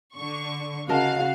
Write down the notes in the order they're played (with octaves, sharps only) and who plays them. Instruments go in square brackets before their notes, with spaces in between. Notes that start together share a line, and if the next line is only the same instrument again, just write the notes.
[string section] D3 C#6
[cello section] C#3 [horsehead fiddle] F#4 [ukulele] A#4 D#5 A5 [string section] F5